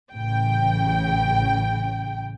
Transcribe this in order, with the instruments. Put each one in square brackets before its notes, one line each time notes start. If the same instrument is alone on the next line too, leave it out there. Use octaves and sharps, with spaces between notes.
[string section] A1 C#3 G5